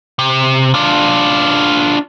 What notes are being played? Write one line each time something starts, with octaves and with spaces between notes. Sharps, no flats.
C3
D4 F4